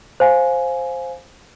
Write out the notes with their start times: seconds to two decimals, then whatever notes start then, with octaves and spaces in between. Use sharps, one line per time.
0.20 C5 F5 G#5